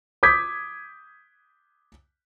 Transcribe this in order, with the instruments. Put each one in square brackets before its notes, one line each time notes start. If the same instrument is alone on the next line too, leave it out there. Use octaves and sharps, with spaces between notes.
[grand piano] D6 D#6 G6 G#6 B6